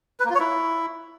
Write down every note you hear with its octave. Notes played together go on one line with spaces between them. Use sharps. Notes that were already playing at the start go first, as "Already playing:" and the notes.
B4
A#3
F4
C#5
E4